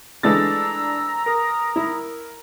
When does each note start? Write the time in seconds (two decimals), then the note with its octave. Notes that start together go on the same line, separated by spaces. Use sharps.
0.23 E3 G#3 A3 D4 A#5 E6 A6
1.26 A#4 D#6
1.76 E4